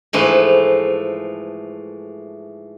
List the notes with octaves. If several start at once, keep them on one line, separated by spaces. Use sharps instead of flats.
G#2 E3 F3 A3